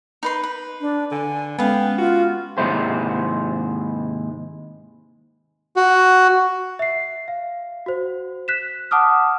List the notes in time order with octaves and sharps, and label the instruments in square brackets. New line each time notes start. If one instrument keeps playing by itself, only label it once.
[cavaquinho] D#4 B4 C6
B4
[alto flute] D4
[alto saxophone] D3 [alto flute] G#5
[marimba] G#3 C#4 [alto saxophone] B3 [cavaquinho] B4 F5 [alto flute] G5
[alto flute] F4 [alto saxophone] F#4
[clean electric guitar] D#2 G#2 C3 G#3 E4 C5
[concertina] F#4
[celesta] E5 C7
F5
F#4 C5
F#6 B6 E7
F#5 A5 D6 D#6 F6